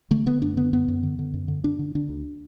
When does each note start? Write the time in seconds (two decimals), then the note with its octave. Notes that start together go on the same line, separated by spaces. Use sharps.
0.11 D3 A3
0.26 D3 B3
0.42 F#2 D4
0.57 D3 B3
0.73 F#2 B3
0.88 F#2
1.03 D3
1.19 D3
1.34 F#2
1.48 D3
1.64 D3 D4
1.79 D3
1.95 D3 D4
2.09 D2